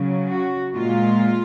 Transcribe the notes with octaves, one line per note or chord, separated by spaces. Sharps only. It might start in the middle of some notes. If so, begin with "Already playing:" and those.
Already playing: C#3 F#3
F#4
A#2 G#3 F4